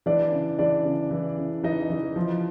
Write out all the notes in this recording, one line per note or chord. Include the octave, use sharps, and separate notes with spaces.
E3 D4 D5
C#3
E3 D4 D5
C#3
E3
C#3
E3 D#4 D#5
E3
F3